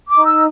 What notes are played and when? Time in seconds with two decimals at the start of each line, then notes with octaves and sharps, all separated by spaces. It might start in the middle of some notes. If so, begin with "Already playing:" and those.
0.08 D6
0.14 D#4
0.25 E6